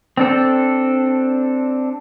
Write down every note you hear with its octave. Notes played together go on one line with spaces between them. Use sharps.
C4 D4 A4